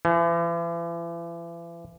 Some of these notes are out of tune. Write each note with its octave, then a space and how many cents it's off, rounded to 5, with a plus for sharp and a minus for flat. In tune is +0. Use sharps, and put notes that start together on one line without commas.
E3 +40